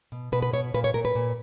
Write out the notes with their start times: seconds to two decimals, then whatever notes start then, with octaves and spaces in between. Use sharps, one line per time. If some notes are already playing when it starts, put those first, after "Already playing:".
0.12 B2
0.32 B2 B4
0.42 B4
0.53 B2 C#5
0.74 A#2 B4
0.84 C#5
0.94 A#2 A#4
1.05 B4
1.15 A#2